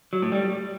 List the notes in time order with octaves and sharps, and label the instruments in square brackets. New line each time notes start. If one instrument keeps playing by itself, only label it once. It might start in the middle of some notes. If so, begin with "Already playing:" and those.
[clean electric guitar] F#3
A2
G3